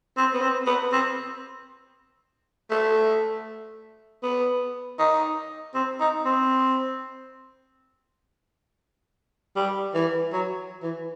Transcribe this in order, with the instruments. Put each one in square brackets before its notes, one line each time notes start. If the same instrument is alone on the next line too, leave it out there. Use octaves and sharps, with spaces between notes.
[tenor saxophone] C4
B3
C4
B3
C4
A3
B3
D#4
C4
D#4
C4
G3
E3
F#3
E3